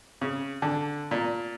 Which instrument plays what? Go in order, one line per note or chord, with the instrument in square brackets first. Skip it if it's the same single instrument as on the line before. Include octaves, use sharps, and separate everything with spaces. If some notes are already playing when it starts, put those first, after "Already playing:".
[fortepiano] C#3
D3
A#2